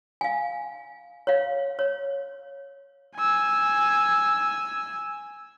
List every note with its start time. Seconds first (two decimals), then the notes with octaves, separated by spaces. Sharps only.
0.21 F5 G#5
1.27 C#5 F5
1.79 C#5
3.16 G#5 E6